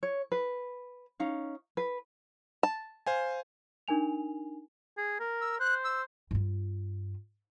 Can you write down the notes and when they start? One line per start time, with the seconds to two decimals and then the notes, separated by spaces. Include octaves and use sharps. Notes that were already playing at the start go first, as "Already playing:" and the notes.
0.03 C#5
0.32 B4
1.20 C#4 D#4 F5
1.77 B4
2.63 A5
3.07 C5 F5 G#5
3.88 D4 D#4 A#4 G#5 F7
4.98 G#4
5.20 A#4
5.41 E6
5.60 C5 F#6
5.84 E6
6.31 G2 F4